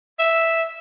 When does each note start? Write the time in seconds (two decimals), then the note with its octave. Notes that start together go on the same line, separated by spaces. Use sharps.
0.19 E5